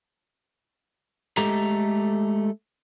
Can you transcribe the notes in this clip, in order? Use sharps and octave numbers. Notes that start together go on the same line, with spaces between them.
G#3 A3 G4 A4 A#5